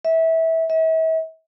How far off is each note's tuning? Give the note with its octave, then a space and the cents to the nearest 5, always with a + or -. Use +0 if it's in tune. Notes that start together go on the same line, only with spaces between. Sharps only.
E5 -20
E5 -40